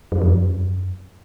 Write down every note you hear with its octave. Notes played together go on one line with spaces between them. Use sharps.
F#2
F2
F#2